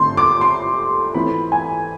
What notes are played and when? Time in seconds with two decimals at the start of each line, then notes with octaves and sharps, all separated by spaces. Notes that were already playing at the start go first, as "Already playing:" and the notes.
Already playing: D3 A3 C4 C6
0.17 D6
0.41 C6
1.14 E3 A3 C4 B5
1.52 G#5